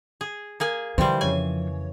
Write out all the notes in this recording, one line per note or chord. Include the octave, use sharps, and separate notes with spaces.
G#4
A#3 G#4 G#5
D3 E3 F3 G3 C5 G5 C6
F2 C#3 C#5 G#5